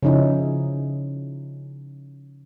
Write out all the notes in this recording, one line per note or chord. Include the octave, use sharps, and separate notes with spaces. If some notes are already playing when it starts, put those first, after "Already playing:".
C#3 F3 C#4 D#4 E4